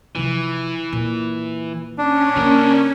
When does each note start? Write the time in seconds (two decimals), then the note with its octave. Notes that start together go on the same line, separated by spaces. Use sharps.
0.15 C3 E3 F3
0.93 A#2
1.98 C#4 D4
2.36 C#3 A#3 A#4